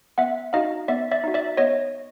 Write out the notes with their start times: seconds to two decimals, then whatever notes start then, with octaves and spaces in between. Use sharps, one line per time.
0.18 B3 E5 F#5
0.53 D#4 F#4 D#5 F5
0.88 B3 D5 E5
1.11 D5 E5
1.24 D#4 F#4
1.34 D5 E5
1.57 B3 C#5 D#5